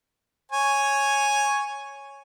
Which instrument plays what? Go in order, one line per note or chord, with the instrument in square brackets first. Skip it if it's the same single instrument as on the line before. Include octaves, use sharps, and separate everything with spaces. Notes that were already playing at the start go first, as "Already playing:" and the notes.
[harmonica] C#5 G#5 C#6